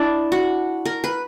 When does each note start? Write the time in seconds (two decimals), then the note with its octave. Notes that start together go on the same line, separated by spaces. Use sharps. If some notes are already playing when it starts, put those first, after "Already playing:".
Already playing: D4 E4
0.32 F#4
0.85 A#4
1.04 B4